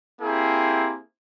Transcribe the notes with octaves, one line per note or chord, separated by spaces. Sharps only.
A#3 C4 E4 G4 G#4